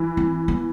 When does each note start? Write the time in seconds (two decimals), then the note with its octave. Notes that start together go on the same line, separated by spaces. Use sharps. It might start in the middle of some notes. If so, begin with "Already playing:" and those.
Already playing: E3
0.17 C4
0.48 B3